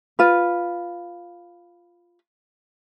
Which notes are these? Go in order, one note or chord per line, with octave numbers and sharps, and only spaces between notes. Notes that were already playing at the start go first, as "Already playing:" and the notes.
F4 B4